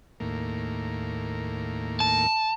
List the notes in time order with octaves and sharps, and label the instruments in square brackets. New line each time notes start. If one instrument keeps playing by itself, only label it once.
[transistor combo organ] D#2 A2 A#3
[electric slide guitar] A5